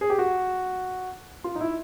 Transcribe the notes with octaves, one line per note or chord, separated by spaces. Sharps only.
G#4
G4
F#4
F4
D#4
E4